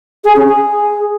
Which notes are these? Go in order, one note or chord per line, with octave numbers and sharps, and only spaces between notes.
G#4
C#4
G#4